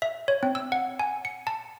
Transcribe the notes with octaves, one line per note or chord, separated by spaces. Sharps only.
E5
C#5
C4
E6
F#5
G#5
C#7
A5